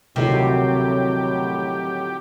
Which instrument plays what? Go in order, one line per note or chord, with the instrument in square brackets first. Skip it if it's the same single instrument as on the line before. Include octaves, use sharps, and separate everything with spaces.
[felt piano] D2 D#3 F3 [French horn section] A2 F#3 [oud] C3 [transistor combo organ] G4